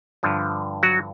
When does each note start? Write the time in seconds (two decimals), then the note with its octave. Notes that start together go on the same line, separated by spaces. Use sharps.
0.23 G2 D3 F3
0.83 F#3 F#4